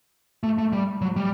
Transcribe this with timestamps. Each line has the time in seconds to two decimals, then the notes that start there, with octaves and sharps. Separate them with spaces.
0.43 A3
0.58 A3
0.73 G3
1.01 F#3
1.16 G3